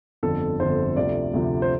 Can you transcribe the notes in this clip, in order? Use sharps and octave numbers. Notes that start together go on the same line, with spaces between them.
G1 F2 D3 A4
G1 F2 D3 C5
D2 C3 F3 D5
D2 C3 F3
C5